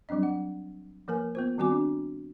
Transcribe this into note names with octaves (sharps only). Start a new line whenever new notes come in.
F#3 G3 C4 D4 D#5
F#5
F3 A#3 A#4 B4 G#5
B3 F4 C5
D#3 G3 C4 F#4 G#5 D6
D4